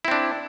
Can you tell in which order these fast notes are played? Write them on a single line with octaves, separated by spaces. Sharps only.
E4 C4 D4